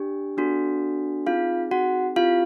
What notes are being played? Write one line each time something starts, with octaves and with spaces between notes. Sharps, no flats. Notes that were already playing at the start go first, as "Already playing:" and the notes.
Already playing: D4 G4
B3 D4 F#4 A4
C4 D#4 F4 G#4 F5
F#4 F#5
C4 E4 F4 G4 F5